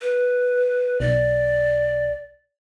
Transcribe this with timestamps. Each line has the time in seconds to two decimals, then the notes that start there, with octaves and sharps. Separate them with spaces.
0.02 B4
1.00 B1 D5